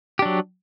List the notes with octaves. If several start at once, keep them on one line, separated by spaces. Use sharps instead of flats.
F#3 D4 G4